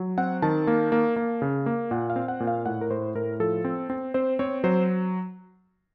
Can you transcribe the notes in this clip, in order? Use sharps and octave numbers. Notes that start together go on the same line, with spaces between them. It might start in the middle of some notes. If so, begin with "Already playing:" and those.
Already playing: F#3
C4 F#5
D#3 A5
A#3
A#3
A#3
C#3
A#3
A#2 F#5
F5
C4
F#5
A#2
F5
A2 F#5
A#4
A2 C5
A2 A#4
F3 A4
C4
C4
C4 C5
C4 C#5
F#3 C5